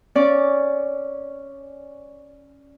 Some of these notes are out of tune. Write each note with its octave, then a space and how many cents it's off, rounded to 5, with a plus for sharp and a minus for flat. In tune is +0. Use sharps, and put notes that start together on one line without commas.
C#4 +0 D5 -5